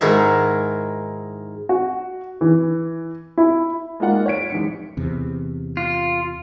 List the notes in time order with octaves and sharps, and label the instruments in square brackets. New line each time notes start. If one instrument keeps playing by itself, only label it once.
[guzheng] G#2 D#3 E4 F#4 G#4 E5
[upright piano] F#4
E3
E4
[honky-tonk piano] G#3 A#3 D#4 F4 F#5
C#5 F#5 B6 D7
A1 G#2 C#7
[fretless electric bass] E2 C3
[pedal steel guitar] F4